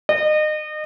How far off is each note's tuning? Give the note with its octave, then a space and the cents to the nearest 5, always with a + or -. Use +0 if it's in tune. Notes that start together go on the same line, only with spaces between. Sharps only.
D#5 -30